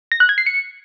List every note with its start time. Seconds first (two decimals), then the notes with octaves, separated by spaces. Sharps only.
0.12 A#6
0.20 F#6
0.29 G#6
0.38 C7
0.46 C#7